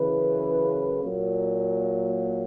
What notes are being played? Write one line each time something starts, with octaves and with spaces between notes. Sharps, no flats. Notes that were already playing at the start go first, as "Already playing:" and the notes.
Already playing: F#2 C#3 E3 B4
A#2 F#3 A#3